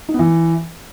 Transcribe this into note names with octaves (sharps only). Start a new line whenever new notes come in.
D#4
B3
E3